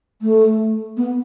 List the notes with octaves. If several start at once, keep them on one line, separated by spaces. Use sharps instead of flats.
A3
B3